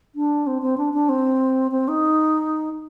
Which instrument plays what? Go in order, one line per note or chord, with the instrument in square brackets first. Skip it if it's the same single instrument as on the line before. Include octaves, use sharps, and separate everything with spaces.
[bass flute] D4
C4
C4
D4
D4
C4
C4
D#4